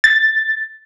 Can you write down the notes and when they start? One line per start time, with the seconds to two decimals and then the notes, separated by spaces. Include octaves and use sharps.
0.04 A6